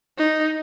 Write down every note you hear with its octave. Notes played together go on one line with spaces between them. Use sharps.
D#4